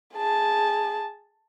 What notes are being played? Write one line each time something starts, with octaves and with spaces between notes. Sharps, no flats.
G#4 A5